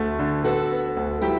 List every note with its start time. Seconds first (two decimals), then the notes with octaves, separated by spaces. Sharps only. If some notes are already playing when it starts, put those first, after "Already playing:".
Already playing: D2 A3 F#4 A4
0.19 D3
0.44 B3 F#4 A4
0.71 B3
0.97 D2
1.22 F#3 E4 G4